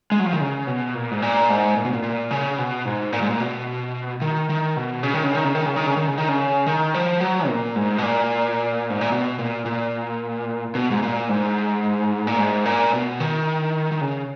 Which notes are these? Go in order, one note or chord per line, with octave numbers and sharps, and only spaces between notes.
G#3
F#3
F3
D#3
C#3
B2
A#2
G#2
A#2
G#2
A#2
B2
A#2
A#2
C#3
B2
G#2
A#2
G#2
A#2
B2
D#3
D#3
B2
C#3
D#3
C#3
D#3
C#3
D#3
C#3
D#3
C#3
D#3
C#3
D#3
C#3
D#3
F3
F#3
A#2
G#2
B2
A#2
G#2
A#2
B2
A#2
A#2
B2
G#2
A#2
G#2
A#2
G#2
A#2
B2
D#3
D#3
C#3